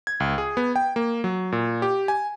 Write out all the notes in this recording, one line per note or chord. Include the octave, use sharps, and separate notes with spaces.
G#6
C#2
G#4
B3
G5
A#3
F#3
A#2
G4
G#5